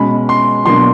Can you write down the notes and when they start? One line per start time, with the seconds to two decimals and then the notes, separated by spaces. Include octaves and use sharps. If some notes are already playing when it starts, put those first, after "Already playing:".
Already playing: B2 G#3 C#4 B5
0.29 C6
0.65 B2 F#3 A#3 D4 C6